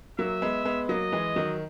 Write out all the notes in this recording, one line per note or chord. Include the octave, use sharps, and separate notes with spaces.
F#3 A#3 E5
G#3 B3
G#3 B3
F#3 A#3 D#5
E3 G#3
D#3 F#3